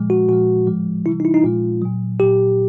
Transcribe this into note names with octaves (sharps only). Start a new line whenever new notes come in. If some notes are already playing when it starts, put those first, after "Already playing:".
Already playing: A#2 F3 G#3
F#4
A#2 F3 G#3 F#4
A2 F3 G#3
C3 E3 G3 E4
D#4
E4
D#4
A#2 F3 G#3 F4
A#2 F#3
A#2 F#3 G4